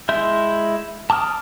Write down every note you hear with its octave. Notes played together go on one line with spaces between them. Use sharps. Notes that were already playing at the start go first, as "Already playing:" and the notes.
G#3 E4 E5 C6 G6
A5 D6 D#6 F6